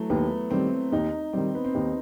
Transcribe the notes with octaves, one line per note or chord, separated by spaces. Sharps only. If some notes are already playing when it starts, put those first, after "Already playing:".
Already playing: E3 F#3 A3
D#2 B3
D#3 G3 C4
D#2 D#4
D#3 G3 C4
B3
C4
D#2 D#4